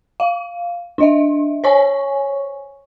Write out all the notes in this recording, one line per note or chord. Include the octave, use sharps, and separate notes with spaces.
F5
D4 D#5 E5
C5 C#5 G#5 C#6